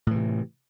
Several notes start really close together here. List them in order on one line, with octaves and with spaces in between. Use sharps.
A2 E3 C3